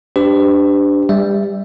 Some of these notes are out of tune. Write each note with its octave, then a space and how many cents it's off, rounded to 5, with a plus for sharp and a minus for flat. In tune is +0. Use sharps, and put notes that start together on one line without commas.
D4 +0 G4 +0 B4 +45
G3 +25 E5 +0